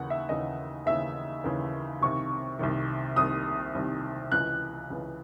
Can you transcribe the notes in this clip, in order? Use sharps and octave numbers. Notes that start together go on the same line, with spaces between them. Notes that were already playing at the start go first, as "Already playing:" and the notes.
Already playing: D#2 C#3 E3 F#5
E5
D#2 C#3 E3 D#5
D#2 C#3 E3 E5
D#2 C#3 E3
C2 C3 D#3 C#6
C2 C3 D#3
C2 C3 D#3 D#6
C2 C3 D#3
C#2 C#3 E3 F#6
C#2 C#3 E3